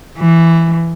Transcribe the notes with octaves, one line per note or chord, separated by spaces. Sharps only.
E3